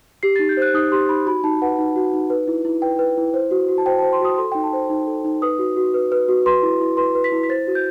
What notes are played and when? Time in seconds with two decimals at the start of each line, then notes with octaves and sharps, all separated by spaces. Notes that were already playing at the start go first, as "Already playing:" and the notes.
0.23 G4 C7
0.36 A6
0.39 D#4
0.49 G6
0.57 C5 F#6
0.74 D#4 D#6
0.92 G4 C6
1.09 D#4 B5
1.26 F#4 B5
1.44 D#4 A5
1.62 B4 F#5
1.78 D#4
1.96 F#4
2.14 D#4
2.30 B4
2.48 E4
2.65 E4
2.82 B4 G5
2.99 B4
3.17 E4
3.34 C5
3.51 F#4
3.68 F#4
3.78 A5
3.86 C5 G5
3.99 A5
4.03 C5
4.13 C6
4.20 F#4 D#6
4.38 A4 C6
4.52 G5
4.55 D#4
4.63 A5
4.73 C5
4.90 D#4
5.07 A4
5.24 D#4
5.42 B4 D#6
5.59 F#4
5.76 F#4
5.94 B4
6.12 B4
6.28 F#4
6.46 B4 C6
6.63 E4
6.81 E4
6.97 B4 C6
7.15 B4
7.24 B6
7.32 E4
7.43 B6
7.49 C5 A6
7.67 F#4
7.75 G6